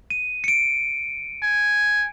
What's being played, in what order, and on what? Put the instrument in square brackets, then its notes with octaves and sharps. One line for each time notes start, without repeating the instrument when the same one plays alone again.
[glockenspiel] D#7
C#7 D7
[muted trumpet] G#5